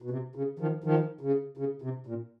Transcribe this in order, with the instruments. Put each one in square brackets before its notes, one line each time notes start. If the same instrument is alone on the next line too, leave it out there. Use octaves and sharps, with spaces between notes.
[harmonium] B2
C3
C#3
D#3 F3
D#3 F3
C#3
C#3
C3
A#2